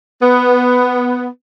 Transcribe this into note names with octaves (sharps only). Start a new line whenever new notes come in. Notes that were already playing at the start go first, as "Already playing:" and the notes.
B3